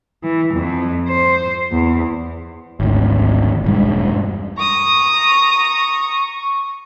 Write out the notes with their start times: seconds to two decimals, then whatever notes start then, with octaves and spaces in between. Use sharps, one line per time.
0.23 E3
0.54 F2
1.09 C5
1.72 E2
2.80 G#1 D2
3.64 E1 G2 G#3
4.58 A#5 C#6 D#6